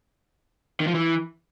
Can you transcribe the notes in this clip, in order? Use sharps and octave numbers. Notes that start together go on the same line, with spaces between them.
D#3
F3
E3